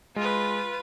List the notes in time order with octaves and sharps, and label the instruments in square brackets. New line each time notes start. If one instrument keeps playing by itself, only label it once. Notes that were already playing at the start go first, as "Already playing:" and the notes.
[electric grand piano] G#3 [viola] F4 B4